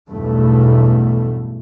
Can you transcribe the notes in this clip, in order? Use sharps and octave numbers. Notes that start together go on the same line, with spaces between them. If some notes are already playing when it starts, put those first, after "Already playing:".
B1 E2 G2 B2 A3